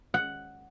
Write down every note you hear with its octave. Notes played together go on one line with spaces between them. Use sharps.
F#5